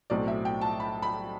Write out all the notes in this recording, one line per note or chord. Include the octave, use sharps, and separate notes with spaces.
B1 A2 F#3 C4 D5
E5
G5
A5
B5
B5